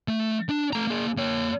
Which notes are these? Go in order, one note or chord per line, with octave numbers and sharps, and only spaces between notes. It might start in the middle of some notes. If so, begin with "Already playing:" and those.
A3
D4
A3 A#5
A#3 G#4
A#3 C#5